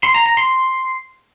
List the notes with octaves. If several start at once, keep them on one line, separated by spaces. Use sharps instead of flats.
C6
A#5
A#5
C6